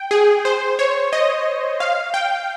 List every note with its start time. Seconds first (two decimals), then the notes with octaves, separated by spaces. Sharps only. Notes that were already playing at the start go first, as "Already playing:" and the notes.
Already playing: G5
0.11 G#4
0.45 C5
0.79 C#5
1.13 D#5
1.80 F5
2.14 G5